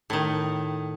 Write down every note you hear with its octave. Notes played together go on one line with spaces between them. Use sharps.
A2 D#3